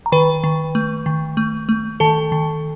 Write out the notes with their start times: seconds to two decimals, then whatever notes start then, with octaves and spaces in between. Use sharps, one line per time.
0.06 A#5
0.12 D#3 B4 B5
0.44 D#3
0.75 A3
1.06 D#3
1.37 A3
1.69 A3
2.00 D#3 A4 A5
2.32 D#3